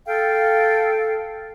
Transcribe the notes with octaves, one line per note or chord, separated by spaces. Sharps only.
A4 F5 G5